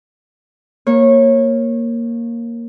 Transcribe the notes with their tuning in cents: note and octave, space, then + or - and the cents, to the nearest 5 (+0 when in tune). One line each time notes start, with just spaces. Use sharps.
A#3 +0 C#5 -20